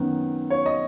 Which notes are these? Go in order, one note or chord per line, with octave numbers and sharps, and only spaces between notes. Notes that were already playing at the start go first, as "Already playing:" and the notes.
Already playing: F#2 D#3 B3
C#5
D#5